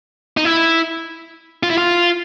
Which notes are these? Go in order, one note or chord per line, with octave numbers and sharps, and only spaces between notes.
D#4
E4
F4
E4
F4